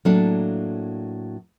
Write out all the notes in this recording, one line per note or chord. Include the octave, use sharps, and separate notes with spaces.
A2 F#3 A#3 D4 A4